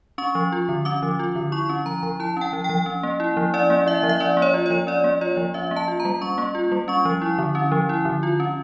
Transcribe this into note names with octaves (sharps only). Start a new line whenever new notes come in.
C#4 C#6
F3
F4
D3
C#4 D6
F3
F4
D3
E4 C#6
C#4
F3 A#5
F3
E4 A5
C#4 G5
F3
G5
F3
C#4
A#3
E4
F3
C#4 D5
A#3
E4 E5
F3
E5
C#4 D5
A#3
C#5
F4
C#5
F3
C#4 D5
A#3
F4 C#5
F3
C#4 E5
A#3
A5
F4
A#5
G3
C#4 C#6
A#3
F4
G3
C#4 C#6
F3
E4
D3
C#4
F3
E4
D3
F4
C#4